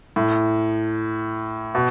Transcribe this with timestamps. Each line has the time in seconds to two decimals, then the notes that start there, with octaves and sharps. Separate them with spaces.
0.16 A2
1.75 B2